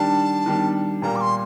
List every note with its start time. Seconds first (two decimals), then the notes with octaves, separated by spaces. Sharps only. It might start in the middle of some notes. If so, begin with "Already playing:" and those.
Already playing: D#3 G3 D4 A5
0.46 D#3 G3 D4
1.02 A#2 G3 A#3 A#5
1.16 D6
1.21 C6